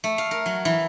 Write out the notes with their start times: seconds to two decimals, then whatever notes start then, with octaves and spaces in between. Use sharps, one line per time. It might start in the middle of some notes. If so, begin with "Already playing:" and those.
0.04 A3
0.18 F5
0.31 A#4
0.46 F#3
0.65 E3